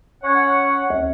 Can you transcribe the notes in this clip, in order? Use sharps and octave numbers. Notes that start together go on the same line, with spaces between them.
C#4 C#5 F#5
D2